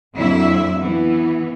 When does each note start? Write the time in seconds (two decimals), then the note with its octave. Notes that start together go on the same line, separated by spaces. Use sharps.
0.14 F2 A#2 D3 F#3 E4 E5
0.80 E3 B3